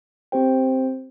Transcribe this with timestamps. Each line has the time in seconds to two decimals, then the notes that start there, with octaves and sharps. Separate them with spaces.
0.32 C4 G4 C5 G5